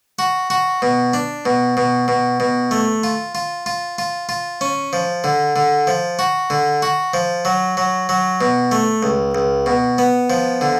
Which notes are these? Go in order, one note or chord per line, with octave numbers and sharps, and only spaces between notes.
F#4
F#4
B2
D4
B2
B2
B2
B2
A3
F4
F4
F4
F4
F4
C#4
F3
D3
D3
F3
F#4
D3
F#4
F3
F#3
F#3
F#3
B2
A3
C#2
C#2
B2
B3
F3
D3